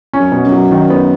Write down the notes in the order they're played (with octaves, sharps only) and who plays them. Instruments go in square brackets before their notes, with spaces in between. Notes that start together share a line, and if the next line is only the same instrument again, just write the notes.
[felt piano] C#4
[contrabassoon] F#2
[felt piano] B2
[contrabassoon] F#2
[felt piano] F#3
D#3
B3